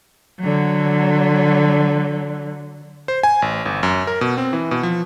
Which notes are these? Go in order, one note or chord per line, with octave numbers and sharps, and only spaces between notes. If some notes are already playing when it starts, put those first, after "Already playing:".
D3 F#3
C5
G#5
A1
G1
F#2
A#4
B2
C4
E3
B2
F3